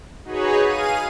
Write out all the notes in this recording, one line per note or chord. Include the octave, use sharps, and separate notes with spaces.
D#4 F#4 G#4 B4 C#5
G#4 F5 D#7